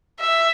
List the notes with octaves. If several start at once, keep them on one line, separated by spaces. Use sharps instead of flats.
E5